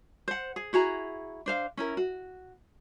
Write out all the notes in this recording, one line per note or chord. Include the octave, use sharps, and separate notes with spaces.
C5 F#5
G#4
E4 F#4 G#4 A#5
D4 C5 F5
C#4 E4 A#4
F#4